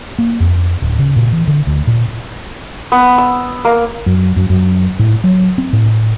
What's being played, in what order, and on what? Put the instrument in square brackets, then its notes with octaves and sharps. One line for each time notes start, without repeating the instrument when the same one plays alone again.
[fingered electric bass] A#3
F2
D1
C#3
A#2
E3
D3
D2
A#2
[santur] B3
E6
A#3
[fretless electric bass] F#2
F#2
F#2
A2
F#3
C4
A2